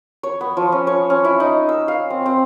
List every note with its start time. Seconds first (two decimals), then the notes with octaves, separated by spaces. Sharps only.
0.23 C#5
0.41 B3
0.57 F3
0.72 C#4
0.87 C#5
1.10 C#4
1.24 E4
1.40 D#4
1.69 E6
1.88 F5
2.10 C4
2.26 C4